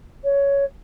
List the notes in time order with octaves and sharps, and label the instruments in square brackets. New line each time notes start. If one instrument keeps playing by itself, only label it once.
[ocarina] C#5